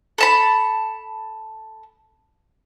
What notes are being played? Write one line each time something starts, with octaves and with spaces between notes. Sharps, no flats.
A4 A5 B5